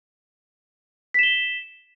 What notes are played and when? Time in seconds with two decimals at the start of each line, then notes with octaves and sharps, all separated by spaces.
1.14 B6
1.19 E7
1.23 G7